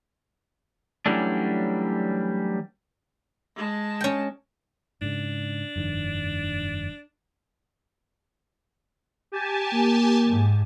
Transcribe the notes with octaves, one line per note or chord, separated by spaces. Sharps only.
E3 F#3 G3 A3 C#4 D4
G#3 A5
C#4 G5
G#2 C#3 D4
F1 G2 D#3
G4 G#5 A5
A#3
G#2